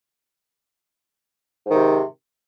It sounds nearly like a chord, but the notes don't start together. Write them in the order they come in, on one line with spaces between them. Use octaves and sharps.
G#2 D#3 C3